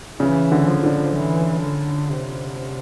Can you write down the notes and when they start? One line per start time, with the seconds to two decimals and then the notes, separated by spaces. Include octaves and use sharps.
0.20 C#3 E3
0.52 D3
0.67 F3
0.83 D3
1.15 E3
1.62 D3
2.10 C3